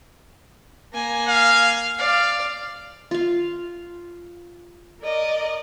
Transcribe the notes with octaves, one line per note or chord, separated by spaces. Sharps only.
A#3 G#5
F5
D5 F5
F4 F5
A#4 D5 D#5